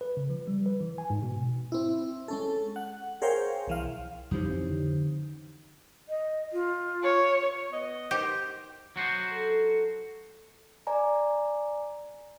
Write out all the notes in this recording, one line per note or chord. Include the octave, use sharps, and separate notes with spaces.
B4
C#3
F3
G3
B4
E3
G#5
G#2
B2
C4 E4
G#3 C#4 A4
F#5
G#4 A#4 C5 C#5 F5 G5
B1 E3 F5
F2 E3 C#4 D#4 G4 C5
C4
D3
D#5
F4
C#5
B3 D#5
D#4 G4 A#4 C5
F#3 F#4 C5
A4
D5 G#5 A#5